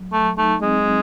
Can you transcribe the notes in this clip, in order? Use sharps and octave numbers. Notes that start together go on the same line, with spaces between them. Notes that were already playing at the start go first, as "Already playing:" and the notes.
Already playing: F#3
F#3 A3
A3 D#4
G#3 C4
F#3